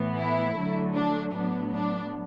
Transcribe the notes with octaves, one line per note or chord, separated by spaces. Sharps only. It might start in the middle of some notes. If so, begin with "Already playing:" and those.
Already playing: A2 E3 B3
E4
D3 F#3 A3
D4
A2 F#3 B3 D4
D4